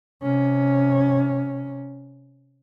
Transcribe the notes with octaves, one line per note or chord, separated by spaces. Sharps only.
C3 C#4